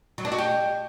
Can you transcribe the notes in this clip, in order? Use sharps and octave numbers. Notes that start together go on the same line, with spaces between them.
F#3
D4
F#4
G4